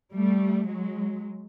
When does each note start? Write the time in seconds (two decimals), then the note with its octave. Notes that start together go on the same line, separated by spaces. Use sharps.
0.14 G3 A3
0.66 F#3 G#3